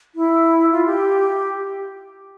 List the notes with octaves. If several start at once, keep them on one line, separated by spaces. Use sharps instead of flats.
E4
F4
G4